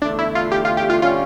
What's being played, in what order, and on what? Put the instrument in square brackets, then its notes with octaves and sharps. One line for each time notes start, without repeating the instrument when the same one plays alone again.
[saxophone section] E2 D3 A3 [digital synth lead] D4
[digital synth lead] E4
F4
G4
F4
G4
F4
[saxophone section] D3 G3 C#4 [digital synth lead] F4